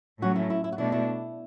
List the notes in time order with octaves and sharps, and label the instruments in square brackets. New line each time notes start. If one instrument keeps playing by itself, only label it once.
[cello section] A2 F#3 A3 C#4 [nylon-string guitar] F#4
[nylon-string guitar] E4
E4
E4
F#4
[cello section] B2 A3 D4 [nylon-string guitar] E4
[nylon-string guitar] E4